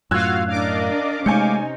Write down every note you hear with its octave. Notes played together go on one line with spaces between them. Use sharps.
F#2 A2 F4 F#4 F5 E6 F#6 G#6
D4 A#4 D#5 F5 D6
C3 G#3 A3 C#4 D#4 G#5 G6 C#7